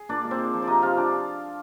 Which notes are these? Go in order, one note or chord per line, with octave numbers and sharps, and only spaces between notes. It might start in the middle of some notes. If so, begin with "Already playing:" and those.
Already playing: G#4
A#2 D4 D5
G#3
C4 C5
G#3
F3
D5
C3 D#4 D#5
C3 F4 F5
F3 D4 D5